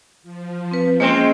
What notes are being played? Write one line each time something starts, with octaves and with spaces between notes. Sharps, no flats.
F3
C4 B4
G#3 A#3 C4 C#4